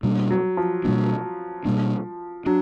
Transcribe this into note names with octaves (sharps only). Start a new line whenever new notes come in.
B2 G3 A#3 D4
F#3
F3
B2 G3 A#3 D4
B2 G3 A#3 D4
F#3 D4